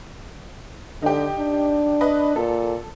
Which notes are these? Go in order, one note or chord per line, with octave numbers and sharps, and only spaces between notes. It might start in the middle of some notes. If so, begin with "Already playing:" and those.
D3 D#4 G4
D4
B4 D#5
A#2 A4